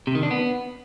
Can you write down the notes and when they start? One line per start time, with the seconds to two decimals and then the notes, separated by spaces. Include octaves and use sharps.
0.07 C3
0.15 D#3
0.23 D4
0.31 B3